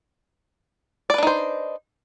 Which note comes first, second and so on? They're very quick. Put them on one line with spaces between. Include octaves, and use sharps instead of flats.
D5 B4 D4 D#4 C5